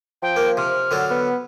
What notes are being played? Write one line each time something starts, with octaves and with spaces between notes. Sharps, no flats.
F3 G5
A#3
C3 F6
D3 F#3 A4
B3